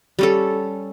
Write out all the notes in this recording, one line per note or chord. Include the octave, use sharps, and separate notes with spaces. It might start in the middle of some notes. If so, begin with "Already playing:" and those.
G3 C#4 A4